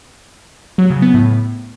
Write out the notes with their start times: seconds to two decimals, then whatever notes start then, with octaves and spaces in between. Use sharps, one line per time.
0.78 F#3
0.90 C#3
1.02 B3
1.14 A2